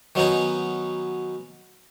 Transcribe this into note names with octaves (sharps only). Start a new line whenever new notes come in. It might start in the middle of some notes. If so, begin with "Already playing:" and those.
D#3 F#3 B3 C#4 D#4